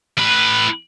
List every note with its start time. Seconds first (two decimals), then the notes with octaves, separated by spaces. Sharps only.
0.19 A2 B4